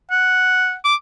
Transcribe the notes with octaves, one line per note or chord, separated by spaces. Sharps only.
F#5
D6